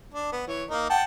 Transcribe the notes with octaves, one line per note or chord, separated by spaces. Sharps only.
D4
B3
E3 C#5
A#3 D#4 A#4
F#5 G5 A5